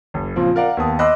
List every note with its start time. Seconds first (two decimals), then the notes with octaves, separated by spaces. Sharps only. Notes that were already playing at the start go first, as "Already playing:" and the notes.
0.14 F#1
0.36 A#2 C#3 F3 C4
0.56 A#4 D5 F5 F#5
0.77 D#2 B3 A5 D#6
0.99 D#5 B5 C6 D6 E6 F#6